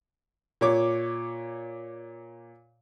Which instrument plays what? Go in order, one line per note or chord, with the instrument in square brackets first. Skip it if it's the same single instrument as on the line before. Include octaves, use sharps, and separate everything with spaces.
[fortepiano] A#2 C#5 D6